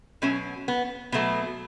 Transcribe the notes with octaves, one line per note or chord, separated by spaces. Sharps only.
B2 F#3 A3 C#4
B3
B2 F#3 A3 B3